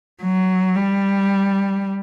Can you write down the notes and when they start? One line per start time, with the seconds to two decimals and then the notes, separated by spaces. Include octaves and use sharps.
0.22 F#3
0.76 G3